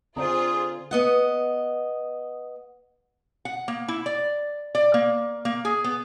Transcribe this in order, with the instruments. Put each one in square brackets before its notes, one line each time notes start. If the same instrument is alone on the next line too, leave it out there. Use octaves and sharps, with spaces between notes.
[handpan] D3 C4 [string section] F4 G#4 [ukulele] C5 D5 A#5 [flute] D#6
[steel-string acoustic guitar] B3 D#5 F#5
[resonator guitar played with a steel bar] F#5
A#3
E4
D5
D5
A#3
A#3
G#4
B3